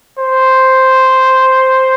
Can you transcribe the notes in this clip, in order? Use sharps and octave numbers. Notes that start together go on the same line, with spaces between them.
C5